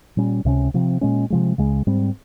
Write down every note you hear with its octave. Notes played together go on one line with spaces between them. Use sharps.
A#2 G3 C#4
C#2 C3 G3 C#4
C3 F3 C4
A#2 G#3 C#4
C3 F3 G#3
C#2 C#3 G#3
G#2 G3 C4